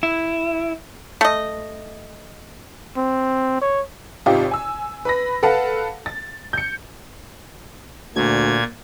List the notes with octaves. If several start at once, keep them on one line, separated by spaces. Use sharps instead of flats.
E4
A3 D#5
C4
C#5
G#1 C3 D#4 F4 G4
G#5 E6
B4 B5 A#6
A4 B4 F5 F#5 A5
A6
G6 C#7
D2 A#2 G#6